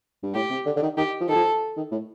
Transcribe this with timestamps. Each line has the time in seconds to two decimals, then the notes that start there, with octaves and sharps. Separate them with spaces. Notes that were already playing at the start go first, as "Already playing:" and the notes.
0.23 G2
0.35 A2 G4
0.50 C3
0.66 D3
0.77 D3
0.82 D#3
0.97 D#3 G4
1.21 F3
1.28 D#3 A4
1.35 F3
1.77 D#3
1.92 A2